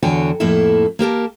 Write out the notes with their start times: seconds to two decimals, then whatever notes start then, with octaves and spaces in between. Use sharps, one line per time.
0.03 E2 D3 F#4 C#5 G5 G#5
0.40 F2 A2 A#3 E4 A4
0.99 A#3 G4 A#4 A5